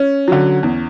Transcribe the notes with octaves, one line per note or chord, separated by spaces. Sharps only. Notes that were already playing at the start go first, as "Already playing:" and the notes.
Already playing: C#4
D3 F#3
E2